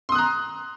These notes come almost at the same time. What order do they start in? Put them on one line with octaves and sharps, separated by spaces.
C6 D#6 F#6 A#5